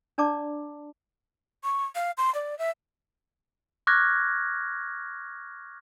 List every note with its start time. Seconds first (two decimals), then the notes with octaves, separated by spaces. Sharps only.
0.18 D4 D5 A5 A#5 D6
1.64 C#6
1.95 F5
2.18 C6
2.35 D5
2.59 E5
3.87 C#6 D6 F6 F#6 G#6 A#6